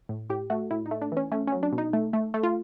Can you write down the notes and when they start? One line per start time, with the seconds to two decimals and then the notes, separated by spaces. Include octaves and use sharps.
0.09 A2
0.30 A2 G4
0.50 A3 F#4
0.71 A2 E4
0.86 D#4
0.91 A3
1.02 D4
1.12 E3 C#4
1.32 A3 C#4
1.47 F#3 C#4
1.63 D4
1.72 B2
1.78 D#4
1.93 A3
2.13 A3
2.34 A3
2.43 F4